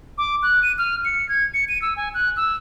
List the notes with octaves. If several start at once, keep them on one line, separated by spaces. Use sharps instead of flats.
D6
F#6
D#7
F6
C#7
G#6
C#7
D#7
E6
G#5
F#6
E6